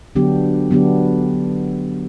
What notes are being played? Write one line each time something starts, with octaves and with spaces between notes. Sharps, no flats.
D3 F#3 B3 D4 G4
D3 F#3 B3 D4 G4